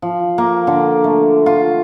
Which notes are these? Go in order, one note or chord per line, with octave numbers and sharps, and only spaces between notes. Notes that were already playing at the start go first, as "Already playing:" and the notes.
F3
A#3
D3
A3
F4